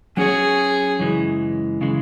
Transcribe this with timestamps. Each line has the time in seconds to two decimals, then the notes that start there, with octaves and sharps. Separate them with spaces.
0.17 F#3 C#4 F#4 G#4 C#5
1.00 F#2 C#3 E3 G#3
1.81 C#3 E3 G#3